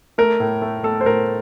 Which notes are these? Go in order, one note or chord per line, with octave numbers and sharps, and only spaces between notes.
A3 A#4
A2
A3
A3 A4
C5
A2 A#4